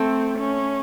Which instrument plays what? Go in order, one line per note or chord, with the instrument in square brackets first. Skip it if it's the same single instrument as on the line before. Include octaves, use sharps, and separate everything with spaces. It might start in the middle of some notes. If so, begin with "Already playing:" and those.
Already playing: [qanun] A3 [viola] C4
[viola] C#4